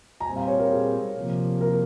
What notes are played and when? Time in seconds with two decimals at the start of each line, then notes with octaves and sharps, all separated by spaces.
0.20 A#5
0.25 A#2 G3 C4 G#5
0.36 F5
0.47 C#5
0.59 A#4
0.71 G#4
1.16 C3 F3 A#3
1.61 A#4